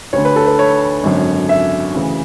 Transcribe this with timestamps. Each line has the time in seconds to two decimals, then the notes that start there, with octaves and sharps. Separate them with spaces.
0.13 D2 D3 C#5
0.25 B4
0.36 A4
0.47 B4
0.59 C#5
1.03 G#1 F#2 D3
1.49 E5
1.94 D2 C#3 E3